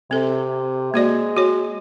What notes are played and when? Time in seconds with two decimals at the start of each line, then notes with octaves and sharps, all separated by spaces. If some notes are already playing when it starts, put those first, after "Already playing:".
0.11 C3 C4 A4
0.94 G#3 A#3 F#4 D5
1.37 F#4 C#5